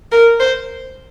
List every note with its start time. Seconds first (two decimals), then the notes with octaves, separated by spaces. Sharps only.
0.12 A#4
0.40 C5